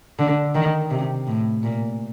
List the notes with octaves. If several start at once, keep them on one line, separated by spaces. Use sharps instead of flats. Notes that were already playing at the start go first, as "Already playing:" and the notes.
D3
D#3
C3
A2
A#2